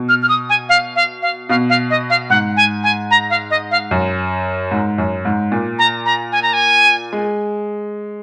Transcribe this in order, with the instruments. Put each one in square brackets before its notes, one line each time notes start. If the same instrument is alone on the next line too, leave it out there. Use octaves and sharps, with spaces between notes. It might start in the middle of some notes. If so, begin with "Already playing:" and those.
Already playing: [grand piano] B2
[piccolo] F6
F6
D#6
G#5
F5
F5
F5
[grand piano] B2 [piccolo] F5
[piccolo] F5
D#5
F5
[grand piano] G#2 [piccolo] F#5
[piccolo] G#5
G#5
A#5
F5
D#5
F5
[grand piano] F#2
G#2
F#2
G#2
A#2
[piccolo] A#5
A#5
G#5
A#5
G#5
[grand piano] G#3